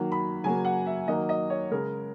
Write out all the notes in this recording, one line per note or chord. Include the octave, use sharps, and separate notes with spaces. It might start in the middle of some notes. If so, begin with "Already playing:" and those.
Already playing: D#3 F#3 A#3
B5
C#3 F#3 A#3 G#5
F#5
E5
D#3 F#3 A#3 D#5
D#5
C#5
C#3 G#3 A#4